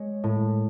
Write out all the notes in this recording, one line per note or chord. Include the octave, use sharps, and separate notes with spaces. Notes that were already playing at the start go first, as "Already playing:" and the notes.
Already playing: G#3 C#5
A2